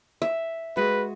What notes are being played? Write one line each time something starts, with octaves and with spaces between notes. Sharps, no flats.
E5
G#3 F#4 B4